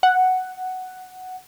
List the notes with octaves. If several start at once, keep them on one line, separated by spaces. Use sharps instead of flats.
F#5